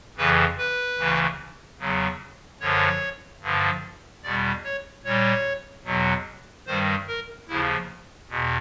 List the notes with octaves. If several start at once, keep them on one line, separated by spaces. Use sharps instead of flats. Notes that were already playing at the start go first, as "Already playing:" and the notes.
F2 C#3 E3 B4
B4
D2 C#3 E3
E2 C#3 F#3
F#2 D3 F3 C#5
G2 D3 F3
E2 B2 G3 D5
C#5
A#2 G3 C#5
E2 B2 F#3
G2 D#3 G3 C5
A#4
D#2 C#3 F3 E4
E2 B2